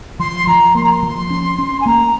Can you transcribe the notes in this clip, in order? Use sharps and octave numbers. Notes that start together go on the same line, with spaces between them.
F3 C6
F3 A#5
A#3 C6
A#5
C6
F3
C#4
C#4
G#5
A#3 A#5